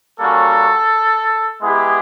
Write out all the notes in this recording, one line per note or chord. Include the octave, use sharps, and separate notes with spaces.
G3 A#3 C#4 F#4 A4
G#3 B3 E4 G4 G#4